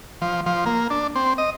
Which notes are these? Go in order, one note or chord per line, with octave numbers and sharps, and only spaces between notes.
F3
F3
A#3
D4
C4
D#5